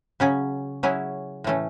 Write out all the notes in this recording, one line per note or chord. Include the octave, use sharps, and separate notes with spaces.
C#3 F#3 C#4 G#4
F#3 C#4 E4 G#4
A2 E3 A3 C#4